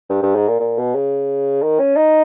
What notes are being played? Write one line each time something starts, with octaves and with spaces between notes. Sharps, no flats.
G2
G2
G#2
A#2
A#2
B2
C#3
D#3
C#4
D#4